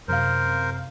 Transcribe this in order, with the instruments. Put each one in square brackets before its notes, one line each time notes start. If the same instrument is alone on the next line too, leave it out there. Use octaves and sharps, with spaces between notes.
[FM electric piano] F#2 C3 F5 [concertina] A#4 C5